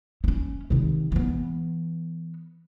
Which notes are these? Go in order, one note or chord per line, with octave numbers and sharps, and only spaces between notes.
C4 C#4
C3 D#3
E3 B3